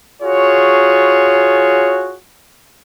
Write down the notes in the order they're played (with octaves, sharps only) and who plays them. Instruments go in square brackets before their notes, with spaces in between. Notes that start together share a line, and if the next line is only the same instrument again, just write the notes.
[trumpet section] F4 F#4 G#4 C#5